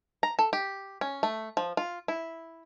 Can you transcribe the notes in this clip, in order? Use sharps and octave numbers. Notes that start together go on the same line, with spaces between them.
A#5
A4
G4
C#4
A3
F3
F4
E4